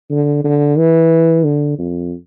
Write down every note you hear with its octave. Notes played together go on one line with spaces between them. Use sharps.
D3
D3
E3
D3
F2